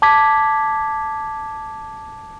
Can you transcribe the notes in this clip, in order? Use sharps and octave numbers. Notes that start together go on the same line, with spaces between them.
A5 D6 G#6 B6